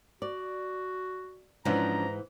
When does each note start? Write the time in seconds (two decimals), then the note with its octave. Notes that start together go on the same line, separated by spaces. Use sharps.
0.22 F#4 D5
1.65 G#2 E3 F3 C#4 D4 A#5